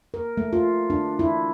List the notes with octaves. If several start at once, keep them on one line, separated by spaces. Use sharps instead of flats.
A#4
A3
F4
D4
E4